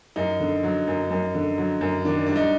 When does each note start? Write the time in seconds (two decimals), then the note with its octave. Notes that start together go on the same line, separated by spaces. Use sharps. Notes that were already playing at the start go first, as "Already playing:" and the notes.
0.16 F#2 D#4
0.40 D3
0.63 F#3
0.87 F#2
1.10 F#2
1.35 D3
1.58 F#3
1.81 F#2
2.05 D#3 D4
2.27 G3 D4
2.36 D#4